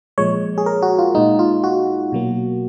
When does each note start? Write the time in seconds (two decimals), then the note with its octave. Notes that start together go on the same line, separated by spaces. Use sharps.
0.18 A#2 F3 G#3 C#5
0.58 G#4
0.66 A#4
0.82 F#4
0.99 F4
1.15 A#2 G#3 D#4
1.39 F4
1.64 F#4
2.12 B2 F#3 A#3